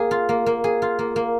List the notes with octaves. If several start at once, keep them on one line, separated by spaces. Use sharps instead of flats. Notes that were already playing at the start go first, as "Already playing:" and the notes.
Already playing: A#3 G#4
F4
A#3
A#3
G#4
F4
A#3
A#3